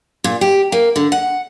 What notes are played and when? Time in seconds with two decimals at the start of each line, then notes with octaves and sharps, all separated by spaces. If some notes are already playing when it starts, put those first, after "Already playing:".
0.24 A#2
0.41 G4
0.72 A#3
0.96 D3
1.12 F#5